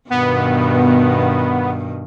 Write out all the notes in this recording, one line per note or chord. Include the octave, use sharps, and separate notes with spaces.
G2 B2 D#3 B3